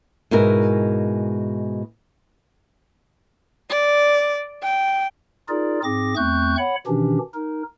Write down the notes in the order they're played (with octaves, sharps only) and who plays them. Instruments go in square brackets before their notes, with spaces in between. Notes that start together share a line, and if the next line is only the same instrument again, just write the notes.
[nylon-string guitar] G#2 B2 G#3 E4 A#4
[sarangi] D5
G5
[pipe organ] D#4 F4 G#4 A#4 D5
G#2 C4 G#4 D6 A#6
E2 A3 C4 C#6 F#6 G6
C#5 F#5 B5
B2 D#3 E3 C#4 D4 G4
D#4 A#4